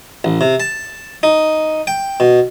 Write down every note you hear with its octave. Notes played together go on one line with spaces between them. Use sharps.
A1
C3
A5
D#4
G5
B2